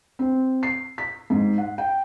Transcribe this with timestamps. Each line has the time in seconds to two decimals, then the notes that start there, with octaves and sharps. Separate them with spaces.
0.19 C4
0.63 C7
0.98 B6
1.30 G#2
1.58 F#5
1.78 G5